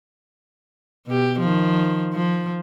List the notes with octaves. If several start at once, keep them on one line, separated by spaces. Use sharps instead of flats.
B2 G4
D#3 F3
F3